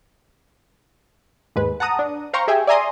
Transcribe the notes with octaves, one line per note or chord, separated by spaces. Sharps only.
D#2 G#2 G#3 B4
F#5 A5 A#5 D#6
D4
C5 F5 G5 A#5 C6 C#6
G4 G#4 E5 G5 G#5
D5 E5 G#5 A#5 C6 D#6